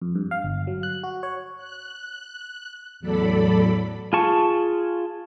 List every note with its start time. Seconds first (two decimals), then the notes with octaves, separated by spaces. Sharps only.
0.02 F2
0.15 G2
0.31 F5
0.44 G1
0.67 F#3
0.83 F#6
1.04 F#4
1.23 C#5
1.56 F#6
3.00 E2 A2 F#3 A4 D5 B5
4.13 F4 G#4 A5 C#6